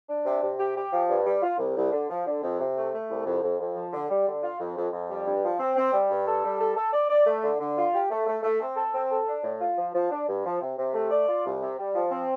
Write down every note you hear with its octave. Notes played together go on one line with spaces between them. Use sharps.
D4
C3
C3
G4
G4
F3
G2
G3
F4
C2
C2
D3
F3
D3
F2
C3
A3
A3
C2
F2
F2
F2
F3
D3
G3
D3
F4
F2
F2
F2
G3
G2
F3
C4
C4
G3
G2
A4
G3
A4
A4
D5
D5
A3
D3
D3
F4
G4
A3
A3
A3
C4
A4
C4
A4
D4
A2
F4
F3
F3
D4
G2
F3
C3
C3
A3
D5
F4
C2
C3
G3
F3
C4